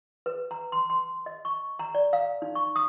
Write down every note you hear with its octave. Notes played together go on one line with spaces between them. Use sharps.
B4
A#5
C6
C6
D#5
C#6
A#5
D5
F5
D#4
C#6
D#6